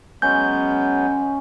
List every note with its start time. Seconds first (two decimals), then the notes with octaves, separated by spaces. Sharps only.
0.22 F#3 G#3 B3 C#4 G6